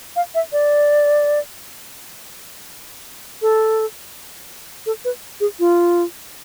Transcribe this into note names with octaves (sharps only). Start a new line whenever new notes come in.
F5
E5
D5
A4
A4
B4
G#4
F4